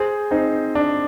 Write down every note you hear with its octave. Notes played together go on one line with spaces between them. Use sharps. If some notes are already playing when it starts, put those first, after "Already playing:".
Already playing: G#4 C5
C4 D#4
D4